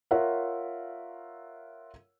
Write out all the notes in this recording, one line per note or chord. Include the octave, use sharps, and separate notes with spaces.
F4 A#4 C#5 E5 F#5